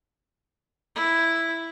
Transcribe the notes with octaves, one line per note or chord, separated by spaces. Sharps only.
E4